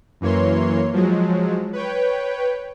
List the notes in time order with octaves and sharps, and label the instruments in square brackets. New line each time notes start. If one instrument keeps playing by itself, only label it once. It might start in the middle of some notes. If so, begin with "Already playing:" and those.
[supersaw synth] F#2 E3 A#3 C#5 C6
F3 F#3 G#3
B4 C#5 G5